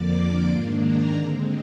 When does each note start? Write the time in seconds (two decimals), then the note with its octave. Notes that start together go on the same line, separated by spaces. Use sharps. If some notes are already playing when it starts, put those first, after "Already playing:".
Already playing: F2 D3 F3 A#3 D5 D6
0.49 G#2 D#3 A#3 D4 C5 C6
0.82 A#4 A#5
1.15 D3 G#3 C4